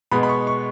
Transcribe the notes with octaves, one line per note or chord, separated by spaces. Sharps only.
B2 G#3 B3 B5
B5
C#6
C#6